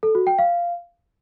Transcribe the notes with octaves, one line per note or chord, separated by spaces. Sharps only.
A4
F#4
G5
F5